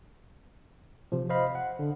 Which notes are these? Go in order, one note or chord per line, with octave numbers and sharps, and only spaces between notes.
C3 F3
C5 D#5 F5 B5
F#5
D3